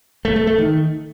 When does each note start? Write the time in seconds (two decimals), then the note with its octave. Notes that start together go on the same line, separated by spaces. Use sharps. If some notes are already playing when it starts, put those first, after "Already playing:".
0.25 A3
0.36 A3
0.47 A3
0.58 D#3